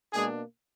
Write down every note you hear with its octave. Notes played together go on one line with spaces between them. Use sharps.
B2 G#3 A#3 D4 G#4